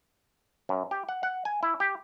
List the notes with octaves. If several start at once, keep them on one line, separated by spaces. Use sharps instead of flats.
F#2
G4
F#5
F#5
G#5
E4
G4